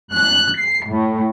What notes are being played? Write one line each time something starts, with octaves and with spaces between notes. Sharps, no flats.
F#6
C7
A2